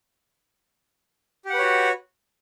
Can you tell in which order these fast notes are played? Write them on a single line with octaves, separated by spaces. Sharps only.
G4 F#5 B4 C#5 F#4